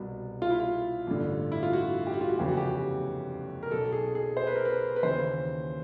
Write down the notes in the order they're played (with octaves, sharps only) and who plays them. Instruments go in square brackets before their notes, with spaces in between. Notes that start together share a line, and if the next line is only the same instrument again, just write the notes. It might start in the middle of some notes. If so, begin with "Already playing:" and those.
Already playing: [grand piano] C2 B2
F4
E4
F4
A1 G2 D3
E4
F4
F#4
G4
F#4
F4
F#4
F1 E2 C#3 E3 G4
F#4
G4
A#4
B1 B2 A4
G#4
G#4
C5
B4
A#4
B4
B4
D#2 C#3 E3 C5